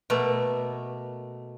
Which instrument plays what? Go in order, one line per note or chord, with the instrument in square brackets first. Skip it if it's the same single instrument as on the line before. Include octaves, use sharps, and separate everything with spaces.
[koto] B2 A3 A#3